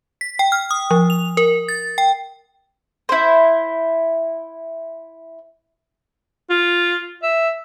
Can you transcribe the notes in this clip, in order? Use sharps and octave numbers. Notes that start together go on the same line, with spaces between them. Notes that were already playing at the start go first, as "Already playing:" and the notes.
B6
G5
F6
D#6
F3
F7
A#4
A6
G5
E4 C5
F4
E5